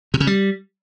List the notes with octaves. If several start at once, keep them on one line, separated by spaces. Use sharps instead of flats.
C3
C#3
G3